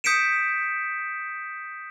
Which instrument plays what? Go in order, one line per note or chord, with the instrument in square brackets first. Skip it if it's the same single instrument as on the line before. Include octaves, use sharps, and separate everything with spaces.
[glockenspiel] D#6 G6 B6 C#7 D7 E7